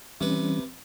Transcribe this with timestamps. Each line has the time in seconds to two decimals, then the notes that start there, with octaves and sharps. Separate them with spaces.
0.21 C3 E3 G3 C#4 B4